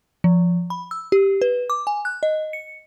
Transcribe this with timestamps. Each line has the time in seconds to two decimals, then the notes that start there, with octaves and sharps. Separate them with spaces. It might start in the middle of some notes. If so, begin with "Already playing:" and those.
0.24 F3
0.70 B5
0.91 E6
1.12 G4
1.41 B4
1.70 D6
1.87 G#5
2.05 F#6
2.23 D#5
2.53 C#7